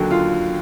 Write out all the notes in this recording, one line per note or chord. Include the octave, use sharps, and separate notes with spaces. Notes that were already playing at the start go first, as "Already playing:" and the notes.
Already playing: D#2 D3 F#3
F4